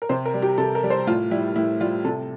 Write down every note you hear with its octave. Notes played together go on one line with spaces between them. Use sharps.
A#4
C3 C5
A#4
G3
G4
C3 A4
A#4
G3
C5
A2 F4
G3 E4
A2 E4
G3 F4
C3 A4